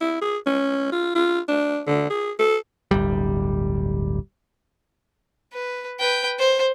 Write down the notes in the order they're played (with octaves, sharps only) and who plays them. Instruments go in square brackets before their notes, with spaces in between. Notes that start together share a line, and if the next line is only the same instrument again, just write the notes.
[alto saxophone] E4
G#4
C#4
F4
F4
D4
D3
G#4
A4
[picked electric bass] D1 G1 G3
[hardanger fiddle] B4
B4 G5
C5